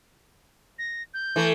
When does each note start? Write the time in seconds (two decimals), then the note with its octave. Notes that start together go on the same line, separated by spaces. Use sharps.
0.79 A#6
1.14 G6
1.36 E3 A3